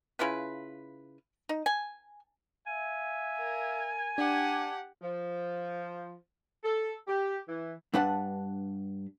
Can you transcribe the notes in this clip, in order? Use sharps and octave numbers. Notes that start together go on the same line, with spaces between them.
C#3 E4 F4 B4
D#4
G#5
E5 F5 G#5
A#4
D4 G4 F#5 A5 D6
F3
A4
G4
E3
G2 D4 B4 F#5 A5